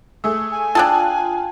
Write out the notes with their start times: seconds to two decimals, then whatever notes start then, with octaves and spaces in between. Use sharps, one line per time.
0.24 A3 G#4 E6
0.51 G#5
0.75 D4 F4 G#4 A4 G5 A5 D#6 F#6